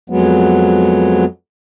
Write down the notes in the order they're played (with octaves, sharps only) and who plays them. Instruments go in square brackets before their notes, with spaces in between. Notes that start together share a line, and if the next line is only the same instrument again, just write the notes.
[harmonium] F2 F#3 G#3 B3